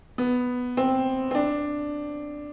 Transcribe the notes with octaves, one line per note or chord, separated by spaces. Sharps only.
B3
C4
C4
D4